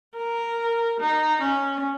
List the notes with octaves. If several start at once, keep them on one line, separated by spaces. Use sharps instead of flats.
A#4
D#4
C#4